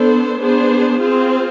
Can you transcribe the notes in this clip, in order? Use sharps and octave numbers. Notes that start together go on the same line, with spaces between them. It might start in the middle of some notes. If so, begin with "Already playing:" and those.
Already playing: B3 D4 A4 C5
B3 D4 G#4 C5
C4 F4 G#4 C5